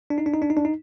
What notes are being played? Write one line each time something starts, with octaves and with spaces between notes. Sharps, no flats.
D4
D#4
D4
D#4
D4
D#4
D4
D#4